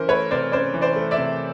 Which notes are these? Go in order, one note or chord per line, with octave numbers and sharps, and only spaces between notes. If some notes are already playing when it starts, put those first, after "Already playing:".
Already playing: E3 C#4 A#4 C5
A3 B4 C#5
C3 C5 D5
C#4 C5 D5
E3
C5 D5
A3
D5 E5
C3